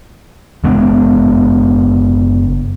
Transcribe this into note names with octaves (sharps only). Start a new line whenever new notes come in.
F#1 G#3 B3 D4